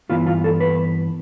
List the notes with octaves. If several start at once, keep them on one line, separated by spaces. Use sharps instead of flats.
G2 E3 B3 E4 F4
F4
A4
B4